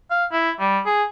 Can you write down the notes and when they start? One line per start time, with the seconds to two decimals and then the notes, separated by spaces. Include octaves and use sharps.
0.11 F5
0.33 E4
0.60 G3
0.86 G#4